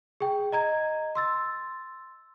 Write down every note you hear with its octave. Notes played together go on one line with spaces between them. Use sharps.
G#4 G5
D#5 A#5 G#6
C6 E6 A6